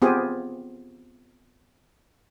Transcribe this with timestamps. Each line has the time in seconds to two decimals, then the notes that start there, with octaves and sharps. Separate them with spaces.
0.02 B3 C4 F4 G4 G#4